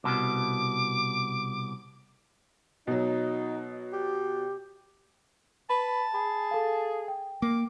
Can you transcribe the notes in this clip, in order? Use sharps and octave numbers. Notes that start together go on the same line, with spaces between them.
C2 B2 D6
B2 F#3 D#4
G4
B4 A5 B5
G#4 B5
A4 F5
G5
A#3 D6